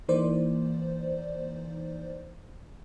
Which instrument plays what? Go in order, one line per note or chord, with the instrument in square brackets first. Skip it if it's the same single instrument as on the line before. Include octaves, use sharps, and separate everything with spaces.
[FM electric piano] E3 A#3 D#4 C5 D5